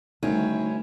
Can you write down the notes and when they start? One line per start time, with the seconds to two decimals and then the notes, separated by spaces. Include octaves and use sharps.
0.23 D2 D#3 G3 A3 C#4 E4